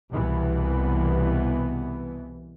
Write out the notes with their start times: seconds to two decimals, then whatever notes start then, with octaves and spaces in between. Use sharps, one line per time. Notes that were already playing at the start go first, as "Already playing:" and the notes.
0.11 C2 B2 E3 B3